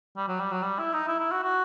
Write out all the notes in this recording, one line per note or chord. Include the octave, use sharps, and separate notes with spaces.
G3
F#3
G3
F#3
G3
E4
D#4
E4
E4
F#4
F#4